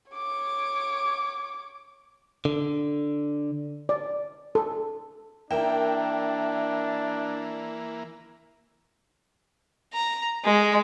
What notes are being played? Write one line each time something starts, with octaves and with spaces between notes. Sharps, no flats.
C#5 D6
D3
D5
A4
E3 A#3 D4 A#4 E5 G5
A#5
G#3